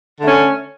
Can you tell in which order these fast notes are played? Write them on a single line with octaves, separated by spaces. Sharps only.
D3 A3 C#4